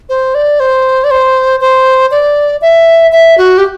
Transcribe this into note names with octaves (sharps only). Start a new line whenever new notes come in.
C5
D5
C5
D5
C5
C5
D5
E5
E5
F#4
G4